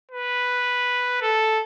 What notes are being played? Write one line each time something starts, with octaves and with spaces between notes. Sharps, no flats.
B4
A4